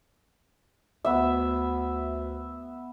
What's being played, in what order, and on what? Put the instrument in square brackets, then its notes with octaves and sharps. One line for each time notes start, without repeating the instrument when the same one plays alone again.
[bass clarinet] D2 [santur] B3 E5